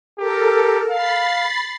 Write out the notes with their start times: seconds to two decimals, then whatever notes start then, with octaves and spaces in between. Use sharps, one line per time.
0.18 G4 A4 A#4
0.90 F5 B5 A6 C7